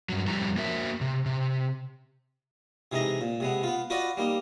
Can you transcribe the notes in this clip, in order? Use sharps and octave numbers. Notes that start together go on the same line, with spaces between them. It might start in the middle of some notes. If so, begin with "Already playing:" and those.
G2 F#3
F2 G3 E4 G4 A#5
A#3 F#4 A#4 E5
C3
C3
C3 E3 G#3 D#4 A#5
A#2
C3 G#3 B3
B3 F4
F4 F#4 B4 D5 D#5
G3 A#3 D#4